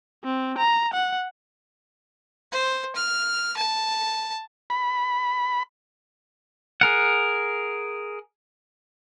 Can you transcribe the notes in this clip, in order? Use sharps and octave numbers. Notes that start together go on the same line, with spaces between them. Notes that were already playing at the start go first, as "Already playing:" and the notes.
C4
A#5
F#5
C5
F6
A5
B5
G#4 A#4 F#5